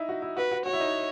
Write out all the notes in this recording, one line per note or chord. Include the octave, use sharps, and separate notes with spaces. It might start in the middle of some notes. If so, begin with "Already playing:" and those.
Already playing: D#4 E4
F#4
E4
F#4 B4
F#4
F#4 C#5
E4
D#4